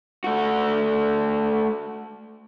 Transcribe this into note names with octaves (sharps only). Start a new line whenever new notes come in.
A3 F#4